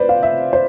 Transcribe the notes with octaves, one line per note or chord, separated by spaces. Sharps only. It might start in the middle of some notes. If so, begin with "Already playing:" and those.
Already playing: B4 C5 D5
F5
E5
C5